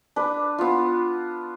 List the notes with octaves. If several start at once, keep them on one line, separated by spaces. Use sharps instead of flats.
D4 B4
B3 F4